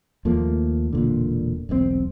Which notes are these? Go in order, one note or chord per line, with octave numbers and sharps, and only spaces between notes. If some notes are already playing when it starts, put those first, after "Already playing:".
D#2 F3 A3 A#3
E1 A#2 D3
E1 B1 C#3 C4